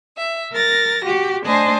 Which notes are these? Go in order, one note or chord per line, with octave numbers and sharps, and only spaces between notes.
E5
A#4 A6 A#6
F#4 G4
A3 D4 C5 D#5 G#5 A5